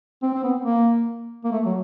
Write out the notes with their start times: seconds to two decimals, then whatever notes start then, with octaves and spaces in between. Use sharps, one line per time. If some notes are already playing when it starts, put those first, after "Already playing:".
0.23 C4
0.34 C4
0.44 B3
0.65 A#3
1.44 A#3
1.52 A3
1.66 F#3